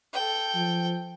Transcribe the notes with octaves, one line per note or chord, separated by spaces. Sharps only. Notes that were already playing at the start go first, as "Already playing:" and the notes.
A4 G5
F3